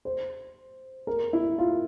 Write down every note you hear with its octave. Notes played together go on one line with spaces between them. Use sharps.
C5
A#4
E4
F4